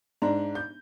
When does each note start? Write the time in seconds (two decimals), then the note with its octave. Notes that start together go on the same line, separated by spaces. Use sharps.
0.22 G#2 D4 A#5
0.55 G6